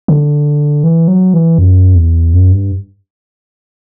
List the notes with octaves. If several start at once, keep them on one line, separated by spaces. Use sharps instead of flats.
D3
E3
F#3
E3
F#2
E2
F#2
G2